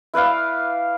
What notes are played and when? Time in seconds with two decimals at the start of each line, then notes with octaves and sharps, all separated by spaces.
0.14 E4 B4 D5 F5